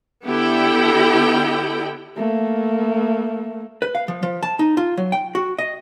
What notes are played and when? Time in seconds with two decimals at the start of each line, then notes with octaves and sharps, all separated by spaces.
0.25 D3 B3 E4 G4 A4 G5
2.17 A3 A#3
3.82 B4
3.95 F5
4.08 F3
4.23 F3
4.43 A5
4.59 D#4
4.77 F4
4.97 F#3
5.12 G5
5.35 F#4
5.59 D#5